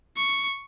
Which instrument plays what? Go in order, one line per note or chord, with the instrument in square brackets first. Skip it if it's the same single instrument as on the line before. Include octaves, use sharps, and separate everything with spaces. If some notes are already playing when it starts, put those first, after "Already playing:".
[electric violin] C#6